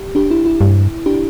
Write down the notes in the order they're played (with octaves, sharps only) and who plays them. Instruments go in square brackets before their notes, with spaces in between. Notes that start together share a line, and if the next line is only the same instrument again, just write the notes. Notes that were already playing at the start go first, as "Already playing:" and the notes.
Already playing: [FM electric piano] G4
D4 G4
E4
E4
[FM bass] G2
[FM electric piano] D4 G4